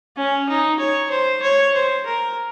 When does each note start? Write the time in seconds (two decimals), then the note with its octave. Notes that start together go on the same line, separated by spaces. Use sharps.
0.17 C#4
0.48 D#4
0.79 C#5
1.10 C5
1.42 C#5
1.74 C5
2.06 A#4